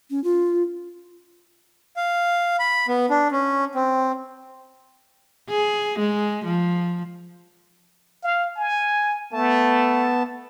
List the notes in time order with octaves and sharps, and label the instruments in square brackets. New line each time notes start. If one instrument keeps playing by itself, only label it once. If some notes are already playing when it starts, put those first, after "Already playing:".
[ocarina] C#4
F4
[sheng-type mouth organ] F5
B5
B3
D4
C#4
C4
[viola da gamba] G#4
G#3
F3
[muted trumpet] F5
G#5
[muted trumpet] A3 [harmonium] B3 A5